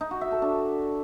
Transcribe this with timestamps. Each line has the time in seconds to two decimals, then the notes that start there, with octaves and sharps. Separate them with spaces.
0.01 D#4
0.11 F#4
0.21 E5
0.32 A4
0.42 D4